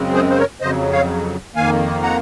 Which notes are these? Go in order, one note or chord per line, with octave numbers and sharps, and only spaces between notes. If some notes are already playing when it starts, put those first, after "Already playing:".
Already playing: F#2 C#3 G#3 C4
G#4 C5
C5
A#4 C#5
F2 C#3 F#3 C5 D#5
C#5 F5
F2 D#3 A#3 F5 G#5
F#5 A#5